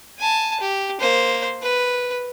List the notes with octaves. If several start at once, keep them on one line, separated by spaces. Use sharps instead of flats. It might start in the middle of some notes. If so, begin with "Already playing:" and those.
G#5 A5
G4
A#3 C5
B4